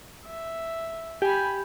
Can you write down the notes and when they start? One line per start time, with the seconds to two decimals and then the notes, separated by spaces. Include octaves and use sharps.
0.26 E5
1.22 G4 G#5 B5